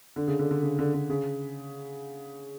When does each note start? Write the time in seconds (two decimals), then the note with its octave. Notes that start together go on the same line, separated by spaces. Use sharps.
0.16 D3
0.28 C#3
0.39 D3
0.51 D3
0.63 C#3
0.79 D3
0.94 D3
1.10 C#3